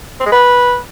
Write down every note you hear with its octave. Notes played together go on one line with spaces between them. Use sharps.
C4
G#3
B4